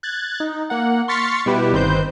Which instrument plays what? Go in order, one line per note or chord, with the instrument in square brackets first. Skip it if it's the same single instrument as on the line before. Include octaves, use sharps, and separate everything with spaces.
[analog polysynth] F#6 G#6 A6
D#4
A#3 F#5
C6 C#6 F6 A6 B6 C#7
B2 G3 E4 G4 B4
G1 D#3 C4 B4 C5 G6